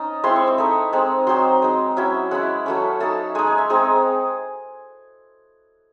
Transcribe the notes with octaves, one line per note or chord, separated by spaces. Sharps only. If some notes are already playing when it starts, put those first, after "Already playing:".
Already playing: C#4 D#4 A5
G#3 C4 E4 C6
C#6
C#6
A3 D#4
G#3 C4 D#4
F#3 C4 D#4 C6
G#3 D#4
F#3 C#4 E4 E5
G#3 C#4 E4 F#5
F#3 A3 C#4
A3 D#4 A5
G#3 D#4 G#5
G#5
E5
G#3 C4 D#4 G#4